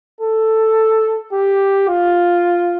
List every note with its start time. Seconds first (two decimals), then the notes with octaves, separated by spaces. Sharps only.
0.21 A4
1.33 G4
1.88 F4